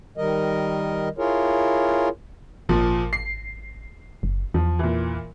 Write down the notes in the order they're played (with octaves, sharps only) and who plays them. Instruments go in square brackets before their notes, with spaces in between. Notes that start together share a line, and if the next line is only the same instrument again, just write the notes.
[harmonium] D#3 G3 A#4 D#5
E4 F4 G#4 A#4 C#5
[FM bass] G#1 [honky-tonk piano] A#2 F3
[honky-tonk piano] C7
[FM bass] F#1
[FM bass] E2 [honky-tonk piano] F3
[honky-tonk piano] A#2 E3